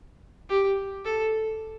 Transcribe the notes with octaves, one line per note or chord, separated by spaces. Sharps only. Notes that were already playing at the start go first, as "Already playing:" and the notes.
G4
A4